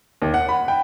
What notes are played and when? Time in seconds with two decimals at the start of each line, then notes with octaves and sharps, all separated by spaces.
0.22 D#2
0.34 F#5
0.49 B5
0.68 G5